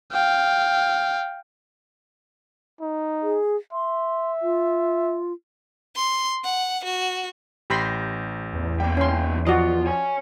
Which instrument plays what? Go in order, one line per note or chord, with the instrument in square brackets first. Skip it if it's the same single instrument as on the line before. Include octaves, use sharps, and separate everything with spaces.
[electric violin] F5 G5
[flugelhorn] D#4
[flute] G#4
[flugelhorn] E5 [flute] C6
[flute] F4
[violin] C6
F#5
F#4
[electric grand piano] A1 G6 A#6 [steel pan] G4 B5 C6
[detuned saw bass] E2
[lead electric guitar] G3 A#3 [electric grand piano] G5
[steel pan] C#4 C6
[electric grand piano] F3 [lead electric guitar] F4 [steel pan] F#4 D5 D#5
[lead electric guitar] C#5 G#5